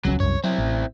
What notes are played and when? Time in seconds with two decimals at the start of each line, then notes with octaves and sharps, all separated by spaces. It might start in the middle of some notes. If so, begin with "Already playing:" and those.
0.05 D#1 C#2 F#3 C#4
0.20 C2 F#2 C#5
0.44 F#3 C4 E4
0.58 A1